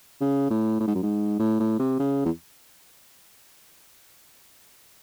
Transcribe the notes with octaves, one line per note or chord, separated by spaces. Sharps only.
C#3
A2
A2
G#2
F#2
G#2
A2
A2
C3
C#3
E2